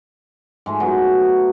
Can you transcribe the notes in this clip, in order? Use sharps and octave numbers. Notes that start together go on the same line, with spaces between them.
G#2 G#3 A3
F#3 B3